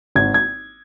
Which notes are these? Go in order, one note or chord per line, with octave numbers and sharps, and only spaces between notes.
G#1 G#6
G#6